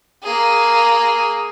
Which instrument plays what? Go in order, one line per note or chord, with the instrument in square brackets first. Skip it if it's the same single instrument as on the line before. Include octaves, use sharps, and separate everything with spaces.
[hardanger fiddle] A#3 G#4